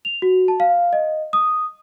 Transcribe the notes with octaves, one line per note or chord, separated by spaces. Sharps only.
F7
F#4
A5
F5
D#5
D#6